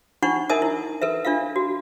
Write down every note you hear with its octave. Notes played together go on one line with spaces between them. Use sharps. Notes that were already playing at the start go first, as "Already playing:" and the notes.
D4 D#4 F4 F#5 C#6
D#4 A#4 D#5 E5 G#5 D#6
E4
A4 B4 E5
D4 F4 E5 F5
F#4